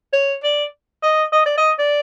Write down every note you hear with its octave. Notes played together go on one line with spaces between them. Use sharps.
C#5
D5
D#5
D#5
D5
D#5
D5